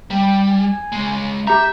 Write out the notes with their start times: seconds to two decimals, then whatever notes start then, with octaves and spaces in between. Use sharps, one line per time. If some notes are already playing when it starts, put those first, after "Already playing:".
0.11 G3 G5
0.48 G#5
0.92 C#3 G#3
1.47 G4 E5 A#5 G6